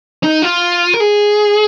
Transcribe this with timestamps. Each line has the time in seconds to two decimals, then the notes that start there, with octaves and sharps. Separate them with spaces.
0.23 D#4
0.42 F4
0.94 A#4
1.00 G#4